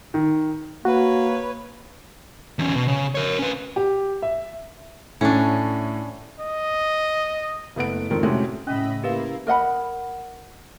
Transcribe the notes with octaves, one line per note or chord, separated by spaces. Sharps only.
D#3
A#3 F#4 B4 C#5
E2 C#4
B2
C#3
A#4 C#5
C#4 B4
G4
E5
A2 C#4 D4
D#5
F#1 A3 B3 B4 F#5 D7
F2 G#2 D3 D#3 C4
A2 C3 G#3 A3 C#4 F#4
A2 C#3 C#4 D#5 E5 B5
A#3 E4 G4 B4 F5
A#4 D#5 F#5 B5